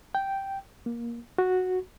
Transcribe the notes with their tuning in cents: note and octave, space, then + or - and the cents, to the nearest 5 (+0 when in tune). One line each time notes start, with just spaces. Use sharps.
G5 -5
A#3 +15
F#4 -5